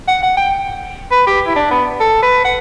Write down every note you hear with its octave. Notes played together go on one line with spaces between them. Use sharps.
F#5
F#5
G5
B4
G4
E4
D4
B3
A4
B4
F#5